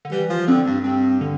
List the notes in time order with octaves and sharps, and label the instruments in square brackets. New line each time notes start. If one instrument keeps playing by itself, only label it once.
[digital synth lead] D3
[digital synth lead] E3 [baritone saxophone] G3
[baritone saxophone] F3
[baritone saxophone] D3 [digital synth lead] C4
[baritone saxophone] G2
[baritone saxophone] G2 [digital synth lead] C4
[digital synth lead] D3